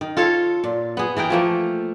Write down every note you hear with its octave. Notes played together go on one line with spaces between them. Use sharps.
D#3
F4 A4 C#5 F5
A#2
B3 G#4
E3 G#4 A#4 G5
F3 A3 A#3